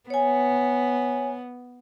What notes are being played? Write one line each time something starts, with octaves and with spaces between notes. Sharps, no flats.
B3 C#5 G#5